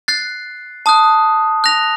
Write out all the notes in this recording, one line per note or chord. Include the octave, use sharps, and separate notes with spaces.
F#6 A6 C7
A5 D#6 F#6
F#6 A#6 F7